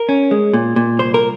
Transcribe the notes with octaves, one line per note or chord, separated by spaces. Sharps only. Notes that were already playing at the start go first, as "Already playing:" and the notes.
Already playing: A#4
C#4
G#3
A#2
A#2
C2 C5
A#4